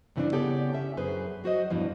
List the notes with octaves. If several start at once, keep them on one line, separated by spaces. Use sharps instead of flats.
G2 C#3 E3 A3 C4 D4
C#3 B3 G4 A4 C#5 D5
C#4 E5
F#2 G#4 B4 C5
F#3 F#4 C5 D#5
E2 G2 B2 E3 F3